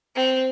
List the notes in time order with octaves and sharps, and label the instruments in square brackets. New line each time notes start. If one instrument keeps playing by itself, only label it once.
[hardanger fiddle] C4